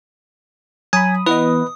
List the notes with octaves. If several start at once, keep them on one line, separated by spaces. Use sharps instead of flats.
F#3 G#5 B5 D#6
E3 B3 B4 D#5 D#6